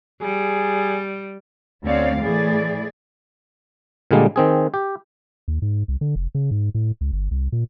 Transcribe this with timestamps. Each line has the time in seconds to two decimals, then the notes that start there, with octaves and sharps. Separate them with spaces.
0.22 G3 G#4
1.85 D2 C4 C#4 C#5 D5 F5
2.20 A2 E3 A3 G#4 D5
4.11 A#2 D3 G3 G#3 A#3
4.36 D#3 C4 G#4
4.74 G4
5.48 D#2
5.62 G#2
5.88 C2
6.01 D3
6.16 F1
6.35 C#3
6.51 G#2
6.75 A2
7.01 C#2
7.13 G1
7.31 C2
7.52 A#2